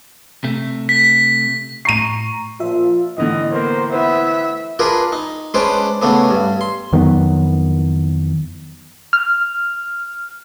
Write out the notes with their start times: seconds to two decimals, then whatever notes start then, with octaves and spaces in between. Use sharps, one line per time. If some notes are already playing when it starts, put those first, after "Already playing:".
0.44 C3 A3
0.89 B6
1.85 A2 A#5 C#6 C7 D#7
2.60 A#2 F3 F4 E5
3.18 A2 D3 E3 D#5
3.52 A#3 B3 A#4 C5
3.92 B3 E4 B4 C5 E5
4.79 D4 F4 G#4 A#4 B4
5.12 D#4
5.54 G#3 C#4 D4 B4 C5 D5
6.02 C#3 A3 B3 D4
6.30 G2
6.61 C6
6.92 F2 D#3 F#3 B3
9.13 F6